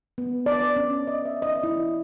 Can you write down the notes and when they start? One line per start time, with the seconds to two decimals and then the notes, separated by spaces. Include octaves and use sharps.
0.18 B3
0.46 D5
0.76 C#4
1.07 D#5
1.26 E5
1.42 D#5
1.64 E4